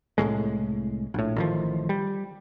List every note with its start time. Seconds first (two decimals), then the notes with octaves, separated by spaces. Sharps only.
0.18 C2 F#2 A2 G#3
1.14 A#1 A2
1.36 A1 D#3 F3
1.89 G3